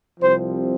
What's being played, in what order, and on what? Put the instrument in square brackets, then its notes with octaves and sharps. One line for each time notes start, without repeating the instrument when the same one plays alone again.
[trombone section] C2 C3 F3 C4 C5